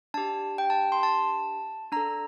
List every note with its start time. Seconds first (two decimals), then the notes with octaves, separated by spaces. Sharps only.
0.14 D4 G4 A5
0.58 G5
0.70 A5
0.92 C6
1.03 A5
1.92 D4 A4 A#5